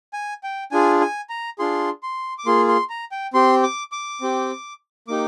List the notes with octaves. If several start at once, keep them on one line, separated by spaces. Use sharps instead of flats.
G#5
G5
D4 F4 G#4 G#5
G#5
A#5
D4 F4 G#4 C6
C6
D6
A#3 F4 G#4 C6
C6
A#5
G5
C4 G4 C6
D6
D6
C4 G4
A#3 D#4 G4 D6